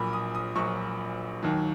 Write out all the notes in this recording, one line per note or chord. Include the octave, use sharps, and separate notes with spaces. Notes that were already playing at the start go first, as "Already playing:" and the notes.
Already playing: A#1 A#2 F#3 B5
D#6
D#6
A#1 A#2 F#3 C#6
D#2 D#3 F#3